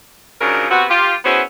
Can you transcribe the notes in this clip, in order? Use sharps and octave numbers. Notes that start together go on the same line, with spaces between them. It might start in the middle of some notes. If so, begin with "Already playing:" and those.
C#3 F3 F#3 D4 D#4 A#4
C3 B3 C4 F#4
F4 G4
B3 C#4 E4 F#4 G#4 C5